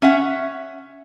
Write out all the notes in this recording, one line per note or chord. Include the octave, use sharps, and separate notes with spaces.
C#4 E5 F#5